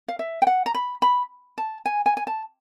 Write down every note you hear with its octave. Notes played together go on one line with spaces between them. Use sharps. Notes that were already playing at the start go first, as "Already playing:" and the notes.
F5
E5
G5
F#5
A#5
B5
B5
A5
G#5
G#5
G#5
A5